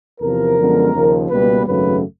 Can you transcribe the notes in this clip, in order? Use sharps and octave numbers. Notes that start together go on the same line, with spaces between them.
E2 C3 F3 A#4
F#2 D3 F3 G#3 B3
D#2 C#3 F3
C#2 B2 G3 A#3 B4
G#1 F#2 C#3 F#3 A3 B4